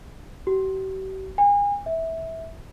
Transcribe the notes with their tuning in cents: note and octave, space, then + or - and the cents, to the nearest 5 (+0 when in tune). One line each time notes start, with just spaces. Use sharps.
G4 -45
G#5 -35
E5 -15